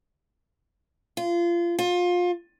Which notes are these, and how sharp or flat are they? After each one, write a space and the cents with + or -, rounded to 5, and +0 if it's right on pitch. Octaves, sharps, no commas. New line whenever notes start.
F4 -25
F4 +25